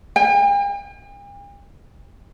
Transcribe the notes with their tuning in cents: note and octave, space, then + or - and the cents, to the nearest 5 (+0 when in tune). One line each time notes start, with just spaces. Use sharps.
G5 +45